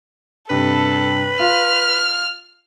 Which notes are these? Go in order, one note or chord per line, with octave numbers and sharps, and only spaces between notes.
G2 C3 A4 B4
F4 F5 F6